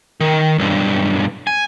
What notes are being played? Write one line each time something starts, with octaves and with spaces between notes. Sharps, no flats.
D#3
B1 G2
G#5